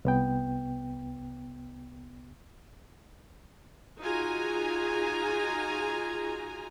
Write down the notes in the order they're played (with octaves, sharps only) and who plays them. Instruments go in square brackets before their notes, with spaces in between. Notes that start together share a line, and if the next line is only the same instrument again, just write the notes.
[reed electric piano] C2 B3 G5
[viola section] D#4 F4 F#4 G#4 G#5 A#5